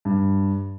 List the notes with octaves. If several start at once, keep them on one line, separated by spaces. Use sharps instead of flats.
G2